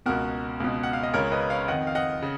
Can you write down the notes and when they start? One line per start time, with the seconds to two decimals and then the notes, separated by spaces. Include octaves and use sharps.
0.06 C#2 B2 F#4 A#4
0.60 C#2 B2
0.83 F#5
0.93 F5
1.03 D#5
1.13 C#2 C#3 A#4 C#5
1.32 B4 D#5
1.50 C#5 F5
1.68 F2 D#3 D#5 F#5
1.87 F5
1.95 D#5 F#5
2.22 C#3